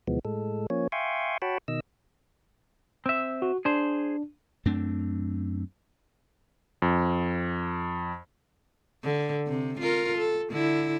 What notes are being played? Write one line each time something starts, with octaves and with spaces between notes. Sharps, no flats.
D2 B2 E3 F3 G#3 B3
A2 G#3 A4
F3 A#3 C#4 C#5
E5 F5 G5 G#5 C6 C#6
F#4 C#5 F#5 G5 A5 B5
B2 D#3 D#5 E6
C4 E5
F#4
D4 G#4 C5
F#2 A3 C4 D4
F2
D3
C3
F4 A#4
A4
D3 E4